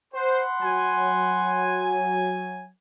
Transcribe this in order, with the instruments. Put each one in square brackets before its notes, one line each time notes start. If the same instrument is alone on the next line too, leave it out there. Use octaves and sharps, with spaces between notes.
[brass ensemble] C5 [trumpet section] F#5 B5 C6
[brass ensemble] F#3 G#5